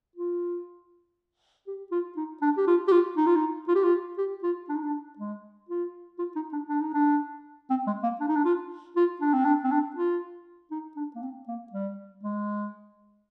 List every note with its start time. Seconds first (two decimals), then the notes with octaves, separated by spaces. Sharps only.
0.15 F4
1.67 G4
1.91 F4
2.17 D#4
2.42 D4
2.57 G4
2.67 F4
2.88 G4
2.92 F4
3.17 D#4
3.26 F4
3.36 D#4
3.68 F4
3.75 G4
3.84 F4
4.18 G4
4.43 F4
4.69 D4
4.76 D#4
4.83 D4
5.18 G#3
5.69 F4
6.19 F4
6.36 D#4
6.53 D4
6.69 D4
6.81 D#4
6.94 D4
7.70 C4
7.87 G#3
8.03 A#3
8.20 D4
8.28 D#4
8.36 D4
8.45 F4
8.96 F4
9.21 D4
9.33 C4
9.45 D4
9.64 C4
9.72 D4
9.96 F4
10.71 D#4
10.96 D4
11.15 A#3
11.23 C4
11.48 A#3
11.72 G3
12.23 G#3